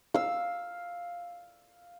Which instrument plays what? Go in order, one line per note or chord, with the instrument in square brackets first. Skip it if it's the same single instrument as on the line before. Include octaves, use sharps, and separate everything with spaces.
[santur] F5 E6